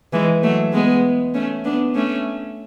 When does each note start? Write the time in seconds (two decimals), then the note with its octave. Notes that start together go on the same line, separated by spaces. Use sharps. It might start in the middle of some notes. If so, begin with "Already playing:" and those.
0.13 E3 G#3
0.43 F#3 A3
0.73 G#3 B3
1.34 A3 C#4
1.65 B3 D4
1.95 A3 C#4